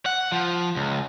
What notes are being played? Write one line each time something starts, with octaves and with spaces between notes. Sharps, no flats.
F#5
F3
C#2